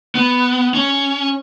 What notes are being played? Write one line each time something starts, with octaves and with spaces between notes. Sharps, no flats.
B3
C#4